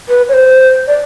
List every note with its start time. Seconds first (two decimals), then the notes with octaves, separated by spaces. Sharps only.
0.08 B4
0.29 C#5
0.33 C5
0.87 D5